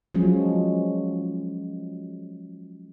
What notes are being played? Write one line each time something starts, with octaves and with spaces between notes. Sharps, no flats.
F3 F#3 G#3 C#4